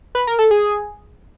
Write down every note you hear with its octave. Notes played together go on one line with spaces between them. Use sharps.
B4
A#4
A4
G#4